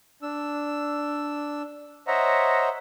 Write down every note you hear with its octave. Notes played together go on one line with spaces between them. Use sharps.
D4 E6
C5 C#5 D#5 E5 F#5 A#5